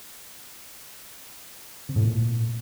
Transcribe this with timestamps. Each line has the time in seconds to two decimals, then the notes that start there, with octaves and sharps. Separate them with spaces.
1.89 C3
1.96 A2
2.03 A#2